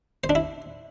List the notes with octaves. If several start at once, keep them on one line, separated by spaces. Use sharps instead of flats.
C5
D4
E4